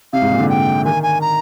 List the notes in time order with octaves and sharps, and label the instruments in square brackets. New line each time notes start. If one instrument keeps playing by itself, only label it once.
[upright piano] C3 [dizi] F5
[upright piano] G#2
A#2
D3
[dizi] G5
[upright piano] D#3 [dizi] G#5
[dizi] G#5
A#5